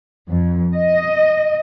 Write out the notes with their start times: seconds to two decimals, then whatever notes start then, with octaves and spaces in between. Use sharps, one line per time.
0.28 F2
0.76 D#5